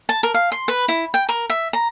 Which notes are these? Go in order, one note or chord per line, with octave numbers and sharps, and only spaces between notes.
A5
A#4
F5
C6
B4
E4
G5
A#4
E5
A#5